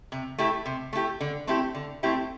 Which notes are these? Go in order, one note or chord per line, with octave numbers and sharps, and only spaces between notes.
C3
A3 E4 G4
C3
A3 E4 G4
D3
A3 C4 E4 G4
D3
A3 C4 E4 G4